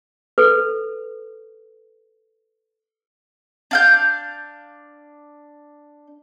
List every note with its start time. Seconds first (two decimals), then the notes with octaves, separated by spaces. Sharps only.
0.38 A4 B4
3.71 D4 F5 G6